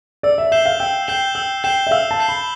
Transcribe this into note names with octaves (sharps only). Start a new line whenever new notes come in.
D5 E6
E5
E5 G6 C7 E7 G7
F5
G5 E6
G5 G6 C7 E7 G7
G5 E6
G5 G6 C7 E7 G7
E5
F5 E6
A5
G6 C7 E7 G7
B5